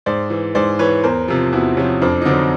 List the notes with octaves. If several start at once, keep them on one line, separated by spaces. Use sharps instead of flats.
G#2 C5 D5
E3
G#2 C5 D5
E3 B4 C#5
E2 A#4 C5
C3 F3
E2 E4 F#4
C3 F3 C#4
F2 C4 D4
D#4
D3 F#3 C4 D4